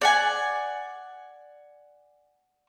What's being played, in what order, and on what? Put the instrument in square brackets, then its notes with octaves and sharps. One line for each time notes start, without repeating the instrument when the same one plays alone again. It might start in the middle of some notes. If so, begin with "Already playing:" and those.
[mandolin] D5 F#5 G#5